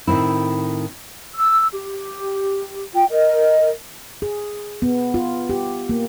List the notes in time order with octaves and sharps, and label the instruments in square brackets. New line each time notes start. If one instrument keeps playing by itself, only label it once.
[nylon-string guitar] A2 D#3 C4 E4
[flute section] E6
G4
F4 G5
A#4 D#5
[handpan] G#4
B3
F4
G4
A#3